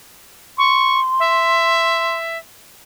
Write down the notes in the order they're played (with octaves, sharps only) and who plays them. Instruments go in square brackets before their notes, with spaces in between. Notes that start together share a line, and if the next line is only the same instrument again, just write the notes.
[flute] C6 [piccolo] C#6
[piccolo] E5